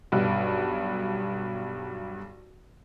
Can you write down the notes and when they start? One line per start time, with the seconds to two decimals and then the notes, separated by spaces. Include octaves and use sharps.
0.12 B1 G2